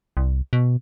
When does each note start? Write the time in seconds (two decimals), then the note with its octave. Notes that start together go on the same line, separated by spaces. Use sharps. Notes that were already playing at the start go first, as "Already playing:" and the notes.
0.17 C2
0.53 B2